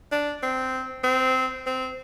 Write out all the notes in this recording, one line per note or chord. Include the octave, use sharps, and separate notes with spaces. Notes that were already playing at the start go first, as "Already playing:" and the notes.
D4
C4
C4
C4